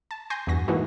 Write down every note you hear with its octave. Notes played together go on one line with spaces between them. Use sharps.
A5
G#5 C6 G6 A#6
E2 G2 F#4 A#6
A2 E3 G#3 A#3 D#4 F#4